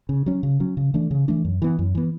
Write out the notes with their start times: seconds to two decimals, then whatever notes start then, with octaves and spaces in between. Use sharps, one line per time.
0.09 C#3
0.26 F#3 C#4
0.43 C#3
0.60 F#3 C#4
0.77 C#3
0.94 E3 A3 D4
1.11 C#3
1.28 E3 A3 D4
1.45 F#2
1.62 E3 B3
1.79 F#2
1.95 E3 B3